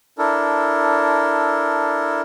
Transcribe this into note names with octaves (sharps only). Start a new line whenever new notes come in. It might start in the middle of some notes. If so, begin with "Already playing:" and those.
D4 E4 A4 A#4